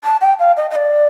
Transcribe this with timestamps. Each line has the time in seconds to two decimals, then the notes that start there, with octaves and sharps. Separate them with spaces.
0.04 A5
0.21 G5
0.39 F5
0.57 D#5
0.70 D#5
0.76 D5